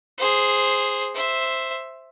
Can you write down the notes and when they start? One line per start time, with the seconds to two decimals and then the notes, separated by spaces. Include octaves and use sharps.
0.18 G#4 C5
1.14 C5 E5